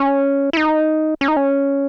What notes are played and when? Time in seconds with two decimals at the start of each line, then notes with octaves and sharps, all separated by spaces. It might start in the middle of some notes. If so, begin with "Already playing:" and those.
Already playing: C#4
0.53 E4
0.57 D#4
1.21 C#4
1.28 D#4
1.37 C#4